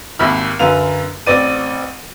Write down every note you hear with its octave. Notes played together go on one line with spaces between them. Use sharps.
G#1 D#2 E5 B5 F6
F#2 D3 B4 F5 A#5 F7
A1 C4 D5 D#7